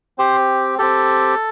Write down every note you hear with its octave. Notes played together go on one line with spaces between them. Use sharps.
C4 G4 C5
C4 G4 A4